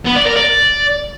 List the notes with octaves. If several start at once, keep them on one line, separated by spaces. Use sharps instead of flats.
B3
D5
A#4
D5